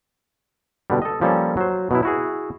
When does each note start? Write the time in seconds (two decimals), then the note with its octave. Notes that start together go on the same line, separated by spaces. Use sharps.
0.90 B2 D3 G3
1.02 A4 D#5
1.21 F3 G3 A#3 C#4 A4
1.57 F#3 C5
1.91 B2 F#3 E4
2.03 E4 F#4 G#4